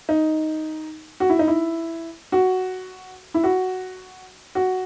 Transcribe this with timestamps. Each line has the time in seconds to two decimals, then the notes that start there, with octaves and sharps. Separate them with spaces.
0.09 D#4
1.20 F#4
1.29 E4
1.39 D#4
1.47 E4
2.32 F#4
3.34 E4
3.44 F#4
4.55 F#4